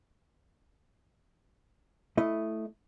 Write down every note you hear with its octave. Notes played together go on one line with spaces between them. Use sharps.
A3 E4 D#5